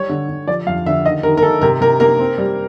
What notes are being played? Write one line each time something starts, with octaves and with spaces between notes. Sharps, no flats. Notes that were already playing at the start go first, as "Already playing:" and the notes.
Already playing: G3 C#5
D3
D3
F3 D5
F2 F5
D3 E5
D#3 D#5
D#3 A#4
A#4
D#3 A4
C3 A#4
C3 A#4
A#3 A#4
C4
G3